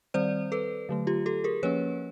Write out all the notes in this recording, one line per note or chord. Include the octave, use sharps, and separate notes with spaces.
D#3 G3 C4 C5 D5
A4 B4
D3 F#3 A3
F4 G4
G4 A4
G#4 A#4
F3 A#3 C#4 B4 C#5